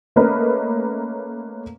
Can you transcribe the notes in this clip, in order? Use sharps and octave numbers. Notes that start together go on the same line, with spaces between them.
A3 A#3 C#4 A#4 B4 D#5